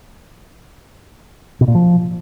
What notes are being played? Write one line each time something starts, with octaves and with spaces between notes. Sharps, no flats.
B2
A#2
F3